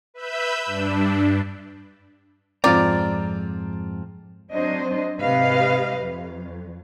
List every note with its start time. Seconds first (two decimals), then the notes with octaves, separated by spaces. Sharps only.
0.14 B4 E5 B5 E6 G6
0.66 G2 D4
2.64 F2 G#2 C4 F4 D5 A#5
4.52 F#3 C4 D4 C5 D#5
5.20 G#2 C3 G4 B4 D#5 F5
5.99 F2